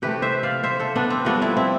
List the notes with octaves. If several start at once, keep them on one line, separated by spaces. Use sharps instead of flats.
C3 E3 A3 G4 B4
C5 E5
D5 F5
C5 E5
A4 C5
B3 D4
C4
G2 F3 A3 B3 D4
C4 E4
C4 E4